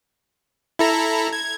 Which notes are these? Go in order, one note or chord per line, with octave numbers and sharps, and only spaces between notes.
E4 A4 A#5
G#6